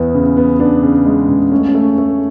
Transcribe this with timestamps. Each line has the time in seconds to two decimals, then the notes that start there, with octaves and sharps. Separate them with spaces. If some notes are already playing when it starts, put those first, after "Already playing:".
Already playing: E2 B3 E4
0.15 C#3
0.37 B3
0.60 B3 D4
0.83 C#3
1.06 G#3
1.29 C#3
1.52 A3 C#4
1.68 C#4
1.74 A3
1.98 A3